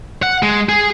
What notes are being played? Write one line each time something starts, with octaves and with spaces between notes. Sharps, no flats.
F#5
G#3
G#4